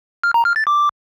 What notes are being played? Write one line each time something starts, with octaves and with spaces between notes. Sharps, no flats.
F6
A#5
F6
A6
D6